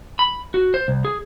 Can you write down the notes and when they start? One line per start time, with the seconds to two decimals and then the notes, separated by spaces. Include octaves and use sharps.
0.19 B5
0.54 F#4
0.74 C5
0.88 C2
1.05 G#4